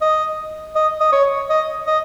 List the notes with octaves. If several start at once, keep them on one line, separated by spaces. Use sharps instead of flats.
D#5
D#5
D#5
C#5
D#5
D#5